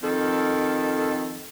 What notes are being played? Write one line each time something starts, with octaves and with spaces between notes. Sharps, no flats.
F2 D#3 A4